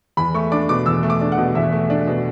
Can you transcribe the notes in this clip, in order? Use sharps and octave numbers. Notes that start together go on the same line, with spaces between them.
E2 B5
A3 C#6
D4 D6
B2 D6
E2 E6
A3
D6
D4
F#5
B2
E2 E5
A3
D4
B2